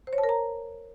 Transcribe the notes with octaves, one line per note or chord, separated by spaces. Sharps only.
C5
C#5
A5
A#4
A#5